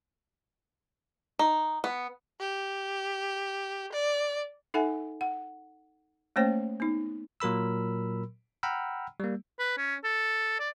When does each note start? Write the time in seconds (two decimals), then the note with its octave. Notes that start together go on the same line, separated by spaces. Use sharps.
1.39 D#4
1.84 B3
2.40 G4
3.93 D5
4.74 D#4 A4 E5 F#5 G#5
5.21 F#5
6.36 A3 A#3 C#4 C5 C#5 G5
6.80 B3 D#4
7.40 A#2 F#3 A#4 B5 E6
8.63 F#5 G5 A#5 B5 E6 F6
9.20 G3 A#3
9.59 B4
9.78 C#4
10.04 A4
10.60 D5